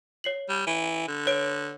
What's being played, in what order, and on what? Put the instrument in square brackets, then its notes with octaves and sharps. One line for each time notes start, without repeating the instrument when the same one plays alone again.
[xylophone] C#5 C7 F#7
[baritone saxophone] G3
E3
D3
[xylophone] B4 C#5 D7